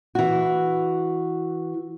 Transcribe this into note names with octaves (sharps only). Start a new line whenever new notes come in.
E3 F#4